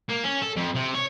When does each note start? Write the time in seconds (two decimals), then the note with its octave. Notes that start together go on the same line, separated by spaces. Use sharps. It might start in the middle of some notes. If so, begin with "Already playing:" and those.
0.09 A#3
0.24 C#4
0.42 A4
0.56 F2
0.75 C3
0.94 C#5